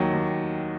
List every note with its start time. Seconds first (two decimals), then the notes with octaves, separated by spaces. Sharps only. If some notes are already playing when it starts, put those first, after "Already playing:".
Already playing: D#2 D#3 F#3
0.13 D#2